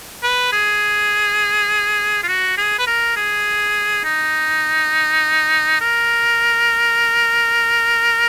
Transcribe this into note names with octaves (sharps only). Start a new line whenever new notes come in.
B4
G#4
F4
F#4
G#4
B4
A#4
G#4
D#4
A#4